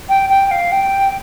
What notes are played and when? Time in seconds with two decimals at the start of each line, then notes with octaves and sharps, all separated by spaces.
0.09 G5
0.29 G5
0.51 F5
0.72 G5